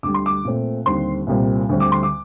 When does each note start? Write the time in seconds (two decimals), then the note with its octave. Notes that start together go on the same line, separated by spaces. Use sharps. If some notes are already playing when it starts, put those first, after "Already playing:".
0.03 D2 D3 G3 D6
0.14 C6
0.26 D6
0.45 A#2 A3 C4
0.86 D#2 D3 G3 C4 C6
1.27 C2 A#2 G3 C4
1.69 D2 D3 G3 C4
1.80 D6
1.92 C6
2.03 D6